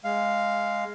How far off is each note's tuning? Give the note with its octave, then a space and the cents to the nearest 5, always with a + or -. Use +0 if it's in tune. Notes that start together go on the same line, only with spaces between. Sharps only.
G#3 +0 F5 +0